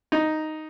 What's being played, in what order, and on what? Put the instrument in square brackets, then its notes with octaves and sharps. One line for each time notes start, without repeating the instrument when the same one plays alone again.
[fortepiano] D#4